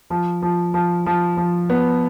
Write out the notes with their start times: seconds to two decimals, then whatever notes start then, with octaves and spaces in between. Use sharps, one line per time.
0.10 F3
0.42 F3
0.74 F3
1.06 F3
1.37 F3
1.70 B3